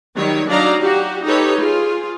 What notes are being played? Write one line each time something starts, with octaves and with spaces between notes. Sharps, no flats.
D#3 F#3 G3 C#5
F#3 D4 D#4 D5 F5 A#5
F#4 G4
D#4 G4 A4 B4 C#5
F4 G#4